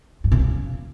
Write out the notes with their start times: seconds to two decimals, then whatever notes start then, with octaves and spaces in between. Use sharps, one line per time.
0.24 G2
0.32 C3
0.39 C#3